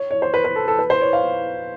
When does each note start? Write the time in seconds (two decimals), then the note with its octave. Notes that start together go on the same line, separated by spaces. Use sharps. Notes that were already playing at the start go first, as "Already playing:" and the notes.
Already playing: C#5
0.11 C#5
0.22 C5
0.34 B4
0.44 B4
0.56 A4
0.68 A4
0.79 B4
0.90 C5
1.01 C#5
1.13 F5